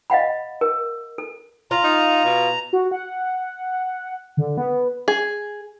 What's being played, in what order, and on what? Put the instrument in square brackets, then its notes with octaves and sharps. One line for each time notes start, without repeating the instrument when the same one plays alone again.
[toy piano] D#5 F5 F#5 B5
A#4
A4
[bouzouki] F4 [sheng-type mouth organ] A#5
[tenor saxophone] D#4
B2
[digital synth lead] F#4
F#5
D3
B3
[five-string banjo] G#4